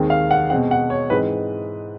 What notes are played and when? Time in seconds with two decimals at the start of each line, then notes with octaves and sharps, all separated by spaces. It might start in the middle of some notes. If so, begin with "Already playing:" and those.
Already playing: D#2 D#3 G#3 C4
0.10 F5
0.31 F#5
0.50 B2 G#3 C4 F#5
0.71 F#5
0.90 C#5
1.10 G#2 E3 G#3 C4 B4